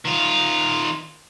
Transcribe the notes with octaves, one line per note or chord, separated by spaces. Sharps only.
D#3 F4